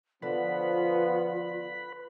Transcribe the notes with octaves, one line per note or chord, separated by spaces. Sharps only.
D3 F3 B3 F4 B4 B5